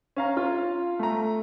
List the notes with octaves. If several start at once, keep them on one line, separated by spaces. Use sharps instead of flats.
C#4 F5 A#5
F4
A3 A#5